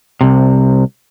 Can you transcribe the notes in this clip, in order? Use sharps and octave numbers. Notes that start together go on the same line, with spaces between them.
C2 C3